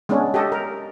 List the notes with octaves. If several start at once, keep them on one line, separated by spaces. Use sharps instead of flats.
G#3 B3 C#4 D4
G4 A4 D#5
A#4